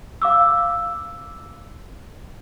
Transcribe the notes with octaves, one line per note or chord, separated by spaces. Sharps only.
F5 D6 E6